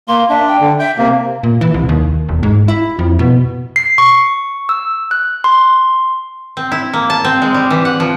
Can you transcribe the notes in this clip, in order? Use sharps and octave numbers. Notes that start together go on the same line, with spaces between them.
A#3 C6
D4 E5
G5
D3
E5 G5
C3 A#3
A#2
E3
C2
D#2
E1
G#2
E4
F2
B2
C7
C#6
E6
F#6
C6
C4
E4
A#3
A5
C4
G#3
G3
E3
F#5
F3